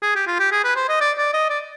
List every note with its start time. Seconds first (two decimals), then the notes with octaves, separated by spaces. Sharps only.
0.03 G#4
0.16 G4
0.28 F4
0.39 G4
0.52 G#4
0.64 B4
0.76 C5
0.89 D#5
1.01 D5
1.18 D5
1.34 D#5
1.50 D5